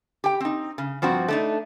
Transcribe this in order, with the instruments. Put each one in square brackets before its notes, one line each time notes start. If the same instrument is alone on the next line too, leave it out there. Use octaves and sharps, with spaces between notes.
[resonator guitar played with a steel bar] G4 G5
C4 D#4
C#3
G2 F3 C4 F#4
A3 D4 D#4